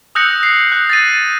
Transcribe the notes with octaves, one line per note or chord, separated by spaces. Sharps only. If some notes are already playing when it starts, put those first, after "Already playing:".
D#6 E6 F#6 G6 A#6 C#7
C7
F#6
A6 A#6 D#7